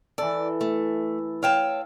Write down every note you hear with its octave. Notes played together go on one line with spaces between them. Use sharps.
E3 A4 D5
A3
C#5 F5 G5 A5